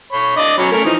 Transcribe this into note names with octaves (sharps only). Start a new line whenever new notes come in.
C#5 B5
D4 D5 D#5
F#3 C#4 B5
A3 C#4 A#4
E3 F3 D#4